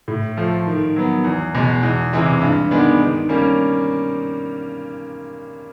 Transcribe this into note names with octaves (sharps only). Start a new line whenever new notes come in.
A2
F3 A3
D#3
F#3 B3
E2
B2 G#3
E2
C3 E3 G#3
G2
D#3 G#3 B3 D4
D#3
G3 A#3 C#4